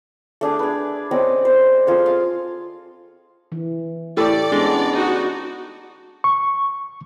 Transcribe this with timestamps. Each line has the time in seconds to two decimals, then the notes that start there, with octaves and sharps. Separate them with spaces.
0.41 A3 D4 G#4 D6
0.59 G#4 B4
1.11 C4 C#4 D5 D#5
1.45 C5
1.87 C4 F4 G#4 A4
2.06 F5
3.52 E3
4.17 A2 G4 A4 D5
4.52 G#3 B3 C#4 D4
4.94 D#4 F#4
6.24 C#6